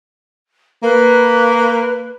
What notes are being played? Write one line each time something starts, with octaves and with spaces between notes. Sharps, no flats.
A#3 B4